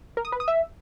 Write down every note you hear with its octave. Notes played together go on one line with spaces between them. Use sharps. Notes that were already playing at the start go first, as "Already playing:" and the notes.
A#4
D#6
B4
D#6
E5